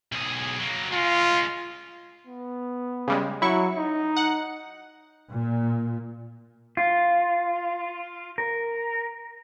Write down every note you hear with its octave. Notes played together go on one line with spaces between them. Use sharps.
B1 G#4
F#3 A#3
G#3 C#4 F4
B3
C#3 G3 G#3
F#3 E4 C#6
D#4
F#5
A#2
F4
A#4